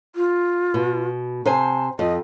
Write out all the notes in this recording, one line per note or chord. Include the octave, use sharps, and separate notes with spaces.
F4
B2
C3 C5 G#5 A5
F2 D#5